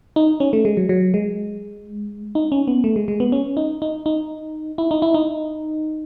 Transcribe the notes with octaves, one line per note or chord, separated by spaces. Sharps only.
D#4
C#4
A3
G#3
F#3
F#3
G#3
D#4
C#4
B3
A3
G#3
G#3
B3
C#4
D#4
D#4
D#4
E4
D#4
E4
D#4